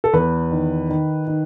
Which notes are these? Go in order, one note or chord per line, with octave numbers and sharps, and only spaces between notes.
A4
E2 B4
D#3
D#3
D#3